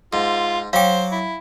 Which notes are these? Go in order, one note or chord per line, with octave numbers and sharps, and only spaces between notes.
G#2 F4
F#3 C5 F5 G5 D6
E4